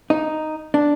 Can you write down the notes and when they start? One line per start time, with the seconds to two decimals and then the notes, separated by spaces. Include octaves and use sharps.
0.10 D#4
0.74 D4